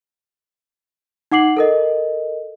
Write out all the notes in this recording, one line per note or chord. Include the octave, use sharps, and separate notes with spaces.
D#4 F#5 D6 C7 F#7
A4 A#4 D#5